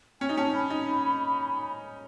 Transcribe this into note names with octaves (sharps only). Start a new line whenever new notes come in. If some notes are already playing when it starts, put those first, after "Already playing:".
C#4 G#5
D#4
C#4 A5
B5
D#4